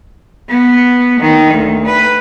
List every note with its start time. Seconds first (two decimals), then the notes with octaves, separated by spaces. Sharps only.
0.49 B3
1.20 D#3
1.54 D2
1.86 B4